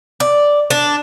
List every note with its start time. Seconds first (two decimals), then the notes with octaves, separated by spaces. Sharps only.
0.20 D5
0.70 D4